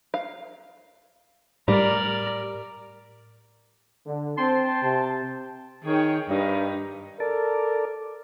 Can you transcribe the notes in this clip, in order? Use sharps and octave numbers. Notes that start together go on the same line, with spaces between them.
F5
A2 G3 A#4 D5
D3
C4 C5 G5 A5 C6
C3
D#3 G#4 C#5 G5
G2 D#3 D#4 B4
A4 A#4 D5